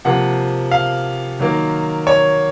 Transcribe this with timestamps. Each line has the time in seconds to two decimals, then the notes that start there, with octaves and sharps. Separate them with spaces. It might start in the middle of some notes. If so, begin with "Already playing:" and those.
0.05 C3 F3 A#3 F#5
0.71 F5
1.39 D#3 F#3 A#3
2.07 C#5